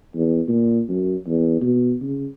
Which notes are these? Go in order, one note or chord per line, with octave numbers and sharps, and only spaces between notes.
E2
A#2
F#2
E2
B2
C#3